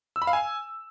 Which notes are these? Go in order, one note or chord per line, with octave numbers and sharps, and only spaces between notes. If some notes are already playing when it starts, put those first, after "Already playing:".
E6
B5
F5
G#5